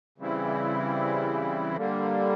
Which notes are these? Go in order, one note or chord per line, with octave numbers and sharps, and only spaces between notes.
C#3 E3 G3 C4 E4
D3 G3 A#3